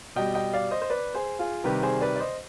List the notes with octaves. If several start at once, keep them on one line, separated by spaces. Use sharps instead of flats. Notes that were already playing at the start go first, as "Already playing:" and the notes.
B2 G3 D#5 G5
D#5 G5
D5 F5
C5 D#5
C5
B4 D5
G#4 C5
F4 G#4
C3 D#3 G3 G4 B4
G#4 C5
B4 D5
D5
C5 D#5